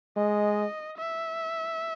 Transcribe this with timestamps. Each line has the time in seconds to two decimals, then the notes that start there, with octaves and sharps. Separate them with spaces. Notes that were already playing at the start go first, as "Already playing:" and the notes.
0.16 G#3 D#5
0.97 E5